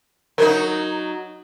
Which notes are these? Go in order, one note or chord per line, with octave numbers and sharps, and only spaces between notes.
F#3 D#4 A#4